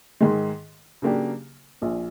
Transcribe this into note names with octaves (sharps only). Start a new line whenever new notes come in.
G#2 D#3 G#3
C#3 F#3 A#3 D4 G4
A#1 A#2 F3